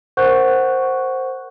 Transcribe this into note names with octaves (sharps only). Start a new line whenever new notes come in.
A#4 C5 F#5 C#6 F#6 G6